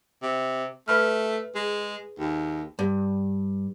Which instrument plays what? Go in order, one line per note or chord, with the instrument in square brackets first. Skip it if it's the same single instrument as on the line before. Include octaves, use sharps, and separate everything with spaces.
[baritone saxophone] C3
[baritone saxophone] A3 [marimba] B4 B5 F6
[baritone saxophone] G#3 [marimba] G#4
[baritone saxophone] D#2
[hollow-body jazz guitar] G2